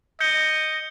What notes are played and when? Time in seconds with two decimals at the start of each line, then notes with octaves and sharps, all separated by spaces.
0.20 D#5 G6 C#7 G7